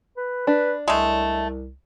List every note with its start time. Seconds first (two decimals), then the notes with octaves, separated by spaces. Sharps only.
0.17 B4
0.47 D4 B4
0.88 C2 G#3 A3